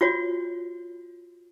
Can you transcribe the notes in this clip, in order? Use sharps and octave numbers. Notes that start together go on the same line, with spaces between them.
F4 F#4 C#5